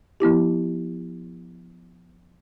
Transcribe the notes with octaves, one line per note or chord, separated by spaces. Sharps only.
F3 B3 E4 G4